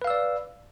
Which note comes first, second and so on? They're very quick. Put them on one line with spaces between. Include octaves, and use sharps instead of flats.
B4 F5 E6 D5